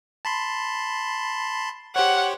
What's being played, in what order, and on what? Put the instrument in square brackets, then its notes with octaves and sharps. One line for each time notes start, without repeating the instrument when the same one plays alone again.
[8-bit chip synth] A5 B5 C6
[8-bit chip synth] G4 C5 C#5 [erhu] F#5